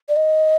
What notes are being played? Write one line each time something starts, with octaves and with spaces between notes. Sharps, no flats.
D5
D#5